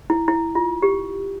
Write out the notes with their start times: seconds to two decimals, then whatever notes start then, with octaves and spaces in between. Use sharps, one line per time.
0.10 E4
0.28 E4
0.55 F4
0.82 G4